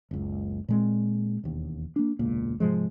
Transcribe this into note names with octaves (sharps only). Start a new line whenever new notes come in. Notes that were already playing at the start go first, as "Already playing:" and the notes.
F#1 C#2
A#2 G#3 C4
E1 D#2
A#3 D4
E1 C#2 A#2 A#3
G#2 C3 F3 G#3